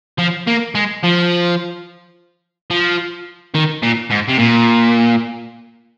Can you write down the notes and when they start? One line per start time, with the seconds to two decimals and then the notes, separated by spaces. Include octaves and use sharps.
0.19 F3
0.47 A#3
0.75 G#3
1.03 F3
2.71 F3
3.55 D#3
3.82 A#2
4.10 G#2
4.28 C3
4.38 A#2